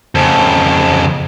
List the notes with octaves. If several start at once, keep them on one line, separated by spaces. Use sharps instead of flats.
F2 C#3